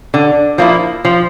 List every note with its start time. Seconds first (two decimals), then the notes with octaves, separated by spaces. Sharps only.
0.14 D3
0.58 F3 A#3 E4
1.05 F3